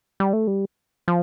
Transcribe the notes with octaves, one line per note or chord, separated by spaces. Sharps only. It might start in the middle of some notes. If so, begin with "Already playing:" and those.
G3
A3
G3
F3